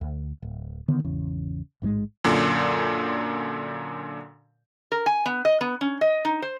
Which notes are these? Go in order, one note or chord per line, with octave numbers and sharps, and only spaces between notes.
D2
D1
D3 D#3 B3
G#1 E2 C#3
A1 G#2 E3 G#3
F#2 A#2 D3
A#4
G#5
B3
D#5
B3
C#4
D#5
D#4
C5